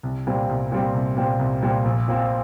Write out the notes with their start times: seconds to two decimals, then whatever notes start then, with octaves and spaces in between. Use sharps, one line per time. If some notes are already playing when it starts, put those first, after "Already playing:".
0.03 C2
0.27 A#2 G3 C4
0.49 C2
0.72 A#2 G3 C4
0.95 C2
1.17 A#2 G3 C4
1.39 C2
1.62 A#2 G3 C4
1.85 A#1
2.08 A#2 F3 C4